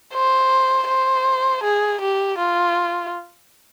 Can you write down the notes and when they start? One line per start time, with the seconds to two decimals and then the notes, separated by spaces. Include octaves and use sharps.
0.13 C5
0.88 C5
1.63 G#4
2.01 G4
2.38 F4